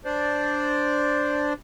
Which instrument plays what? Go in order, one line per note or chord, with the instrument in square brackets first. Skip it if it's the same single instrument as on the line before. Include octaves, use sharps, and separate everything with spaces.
[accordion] D4 C5 D5